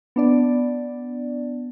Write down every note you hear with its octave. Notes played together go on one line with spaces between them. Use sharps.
B3 D4 D5